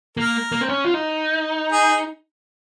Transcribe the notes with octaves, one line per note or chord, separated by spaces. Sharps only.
A#3 A#4
A#3
C4
C#4
F4
D#4
G#4